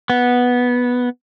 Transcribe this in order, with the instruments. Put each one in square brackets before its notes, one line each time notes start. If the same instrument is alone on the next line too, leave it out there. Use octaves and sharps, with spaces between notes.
[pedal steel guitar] B3